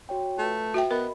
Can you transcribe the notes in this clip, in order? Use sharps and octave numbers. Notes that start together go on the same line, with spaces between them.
F#4 C#5 G5
A3 F4 B4
F#4 E5 G5
B3 A#4 D#5 B5